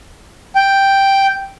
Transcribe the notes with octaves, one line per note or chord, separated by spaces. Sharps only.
G5